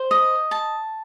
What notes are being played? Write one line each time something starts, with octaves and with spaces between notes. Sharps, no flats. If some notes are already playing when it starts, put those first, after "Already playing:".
Already playing: C5
D#5
A5